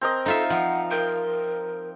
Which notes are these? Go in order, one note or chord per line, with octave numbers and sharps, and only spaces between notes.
C4 A#4 D#5
D#4 F4 A4 E5
F3 F#5
A#4 G5